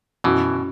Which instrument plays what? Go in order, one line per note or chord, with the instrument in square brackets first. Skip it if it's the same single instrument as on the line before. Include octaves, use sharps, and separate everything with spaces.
[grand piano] F#2 F#3 E4 [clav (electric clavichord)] B2 E3